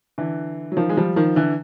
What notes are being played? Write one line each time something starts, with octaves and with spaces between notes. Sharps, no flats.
D3 E3
F#3
D#3 F3
G#3
F3 G3
D#3 F3
D3 E3